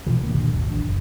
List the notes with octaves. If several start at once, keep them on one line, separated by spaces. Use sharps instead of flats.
B2 E3 F3
D1 D2 A#3
A#2 D3 D#3 F#3
G#1 D#2 D#3 F#3
A1 D4
F#1